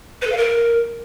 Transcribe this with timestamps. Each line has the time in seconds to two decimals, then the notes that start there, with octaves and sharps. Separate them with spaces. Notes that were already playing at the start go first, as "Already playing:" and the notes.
0.22 B4
0.27 A4
0.32 F5
0.37 A#4